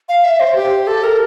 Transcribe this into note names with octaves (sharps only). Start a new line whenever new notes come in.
F5
E5
C5
G4
A4
A#4